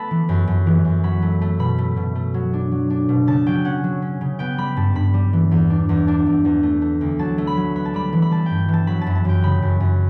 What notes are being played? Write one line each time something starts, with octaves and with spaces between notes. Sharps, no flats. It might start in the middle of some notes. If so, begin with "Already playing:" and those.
Already playing: A3 B3 A5 B5
E3
F#2
F#2
E3
F#2
F#3 B5
A3
A3
B2 B5
A3
B2
A3
F#3
D4
F#3
D4
B2
C#3 A5
F#3 G5
C#4 F#5
F#3
C#4
C#3
B3 G5
G3 B5
G2 A5
G2 B5
G3
E3
E2
D4
E2
D4 A5
E2
E2
A3
A3
D2
F#3 A5
A3
B5
F#3
B3 B5
A5
G3 B5
E3
B5
G3 A5
G2 G5
E3 A5
F#3 B5
A5
F#2
A5
F#2 G5
C#3 B5
F#2
F#2